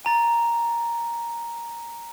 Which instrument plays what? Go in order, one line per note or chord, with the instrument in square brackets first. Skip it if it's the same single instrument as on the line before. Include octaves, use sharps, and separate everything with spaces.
[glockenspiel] G#5 A#5 A6